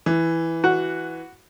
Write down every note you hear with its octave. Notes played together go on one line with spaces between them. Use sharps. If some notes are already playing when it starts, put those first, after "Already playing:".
E3
F#4